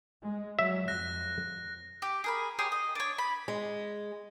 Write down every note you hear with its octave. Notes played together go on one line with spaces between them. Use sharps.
G#3
F#3 E5
F2 F#6 A#6
G4
G#4 A#4 B5
G4 G#4 C#5 C6
D#5
D4 C#5
B5
G#3